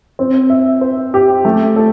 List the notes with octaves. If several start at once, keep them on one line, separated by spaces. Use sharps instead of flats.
C4
E5
C5
G4
A3
A4